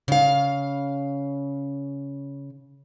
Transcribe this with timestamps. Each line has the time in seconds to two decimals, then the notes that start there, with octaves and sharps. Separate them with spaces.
0.08 C#3 F5